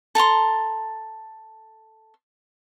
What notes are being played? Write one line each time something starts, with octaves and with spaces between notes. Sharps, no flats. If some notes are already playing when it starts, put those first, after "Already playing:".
A4 A5 A#5 C6